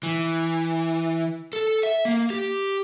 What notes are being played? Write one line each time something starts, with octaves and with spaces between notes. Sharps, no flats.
E3
A4
E5
A#3
G4